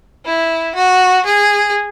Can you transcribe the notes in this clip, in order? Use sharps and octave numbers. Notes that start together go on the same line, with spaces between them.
E4
F#4
G#4